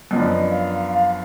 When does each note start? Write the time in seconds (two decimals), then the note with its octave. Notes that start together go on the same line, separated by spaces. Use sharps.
0.11 F#2 F3 B3 D4 D#5
0.50 F5
0.88 F5